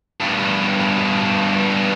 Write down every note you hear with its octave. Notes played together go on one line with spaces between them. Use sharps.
G2 B2